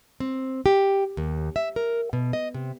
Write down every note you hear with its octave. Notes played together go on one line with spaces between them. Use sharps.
C4
G4
D#2
E5
A#4
B2
D#5
C3